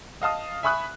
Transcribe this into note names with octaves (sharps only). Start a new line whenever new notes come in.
D#5 F5 A5 D#6
E5 G#5 B5 C#6 D#6 F#6